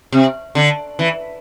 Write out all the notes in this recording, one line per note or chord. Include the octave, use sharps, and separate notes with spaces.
C3
D3
E3